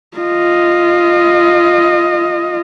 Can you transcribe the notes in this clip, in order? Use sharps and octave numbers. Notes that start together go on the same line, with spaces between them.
F4 D#5